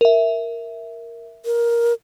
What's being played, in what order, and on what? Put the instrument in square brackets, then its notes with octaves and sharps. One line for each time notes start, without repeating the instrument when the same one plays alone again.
[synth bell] A#4 E5
[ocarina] A#4